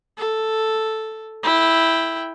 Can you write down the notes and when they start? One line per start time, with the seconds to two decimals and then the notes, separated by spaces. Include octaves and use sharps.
0.18 A4
1.43 E4 G5